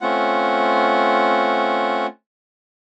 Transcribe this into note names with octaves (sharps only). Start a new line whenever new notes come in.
A3 C4 C#4 F4 F#5